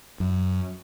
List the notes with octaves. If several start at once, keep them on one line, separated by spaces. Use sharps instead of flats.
F#2